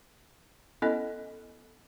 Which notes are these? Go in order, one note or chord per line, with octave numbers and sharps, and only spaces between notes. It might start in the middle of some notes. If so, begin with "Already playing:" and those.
B3 C#4 E4 A4 D#5